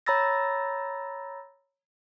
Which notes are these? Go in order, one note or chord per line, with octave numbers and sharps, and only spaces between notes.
C#5 A#5 B5 E6 A6 A#6